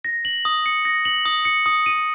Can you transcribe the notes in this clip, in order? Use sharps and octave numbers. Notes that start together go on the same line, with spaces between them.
A#6
F#7
D#6
C#7
A#6
F#7
D#6
C#7
D#6
D#7